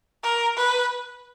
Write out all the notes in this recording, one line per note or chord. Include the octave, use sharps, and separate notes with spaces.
A#4
B4